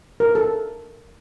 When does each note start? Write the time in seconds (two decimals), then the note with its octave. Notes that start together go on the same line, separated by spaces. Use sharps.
0.20 A#4
0.35 A4